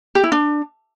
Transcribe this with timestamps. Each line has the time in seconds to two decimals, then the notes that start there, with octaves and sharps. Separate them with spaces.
0.15 G4
0.24 E4
0.32 D4